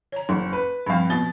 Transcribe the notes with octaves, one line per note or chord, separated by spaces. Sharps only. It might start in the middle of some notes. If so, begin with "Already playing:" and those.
C#5 A#5
F#1
B4
G2 F3 C4 F5
B2 A6 G7